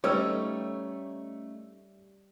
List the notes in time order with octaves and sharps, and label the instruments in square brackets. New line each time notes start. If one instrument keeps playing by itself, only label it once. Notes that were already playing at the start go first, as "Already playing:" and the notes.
[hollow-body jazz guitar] G3 [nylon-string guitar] A3 C#4 D#4 [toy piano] A4 B4 E6 [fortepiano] C#5